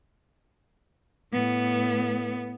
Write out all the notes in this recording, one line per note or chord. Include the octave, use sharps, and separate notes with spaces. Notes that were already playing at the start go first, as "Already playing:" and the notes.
A2 B3